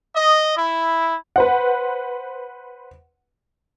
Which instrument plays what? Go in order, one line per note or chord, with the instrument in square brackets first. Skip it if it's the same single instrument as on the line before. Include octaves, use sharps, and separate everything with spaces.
[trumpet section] D#5
E4
[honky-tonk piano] B4 C5 F#5